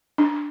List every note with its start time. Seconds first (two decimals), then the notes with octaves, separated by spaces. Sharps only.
0.18 D4